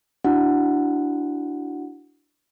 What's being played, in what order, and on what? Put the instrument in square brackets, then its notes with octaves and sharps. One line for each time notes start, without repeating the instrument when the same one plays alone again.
[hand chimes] D4 E4 F#4 F#5